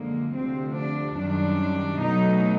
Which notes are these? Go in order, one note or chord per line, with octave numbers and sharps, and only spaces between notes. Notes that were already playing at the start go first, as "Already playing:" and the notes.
Already playing: F#2 D3 F3 G#3 A#3
D2 C3 F3 C4
D4
F#2 D#3 G3 D4
B2 F#3 A3 D#4